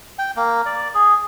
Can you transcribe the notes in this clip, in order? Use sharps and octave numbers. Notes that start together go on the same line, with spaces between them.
G5
A#3
D5
G#4